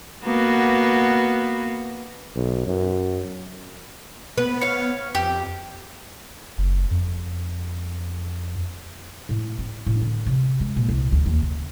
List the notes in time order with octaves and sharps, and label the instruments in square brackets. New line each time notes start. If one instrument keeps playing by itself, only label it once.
[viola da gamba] A#3 B3 F#4
[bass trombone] B1
F#2
[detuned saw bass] B3 [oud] B4
[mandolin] C#5 F5
[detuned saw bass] F2 [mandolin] G4
[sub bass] F#1
F2
[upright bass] A2
C4
A2
D3
C3
G#3
A#2
C2
D2
D#2
C#3